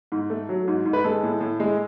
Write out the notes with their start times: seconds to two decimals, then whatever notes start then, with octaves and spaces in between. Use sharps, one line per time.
0.12 G#2
0.30 A3
0.49 F#3
0.68 G#2
0.85 G#2
0.93 B4
1.04 G#3 A4
1.23 A2
1.41 A2
1.60 G#3